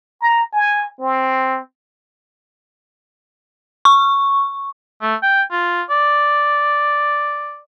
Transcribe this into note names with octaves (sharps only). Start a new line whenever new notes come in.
A#5
G#5
C4
C#6
A3
G5
F4
D5